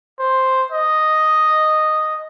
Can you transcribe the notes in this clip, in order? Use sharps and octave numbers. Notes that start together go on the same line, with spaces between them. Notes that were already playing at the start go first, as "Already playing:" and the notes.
C5
D#5